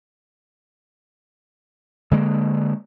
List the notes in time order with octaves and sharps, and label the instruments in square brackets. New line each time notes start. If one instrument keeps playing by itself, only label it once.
[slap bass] D3 G#3 A#3